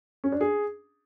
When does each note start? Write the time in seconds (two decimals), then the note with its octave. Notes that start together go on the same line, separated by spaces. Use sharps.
0.24 C#4
0.32 D4
0.41 G#4